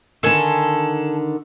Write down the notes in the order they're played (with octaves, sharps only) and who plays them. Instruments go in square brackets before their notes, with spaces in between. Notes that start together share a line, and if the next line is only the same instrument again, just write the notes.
[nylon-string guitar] D3 D#3 [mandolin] A4 G#5